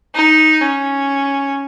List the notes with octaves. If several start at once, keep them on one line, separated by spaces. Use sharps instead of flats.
D#4
C#4